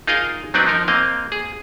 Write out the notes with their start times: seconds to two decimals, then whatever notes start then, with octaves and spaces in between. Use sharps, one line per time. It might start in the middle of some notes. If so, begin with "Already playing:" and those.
0.07 D#4 F4 G#4 A#4 D#5 F5
0.54 F#3 C4 D4 D#4 B4 D5
0.67 F3 D#4 A#4
0.88 A#3 C4 D#5 F5
1.32 G#4